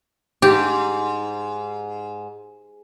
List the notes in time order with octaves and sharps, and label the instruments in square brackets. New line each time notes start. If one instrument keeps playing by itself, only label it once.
[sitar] G#2 [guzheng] G4